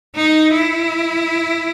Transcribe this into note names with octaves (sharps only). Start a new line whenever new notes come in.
D#4
E4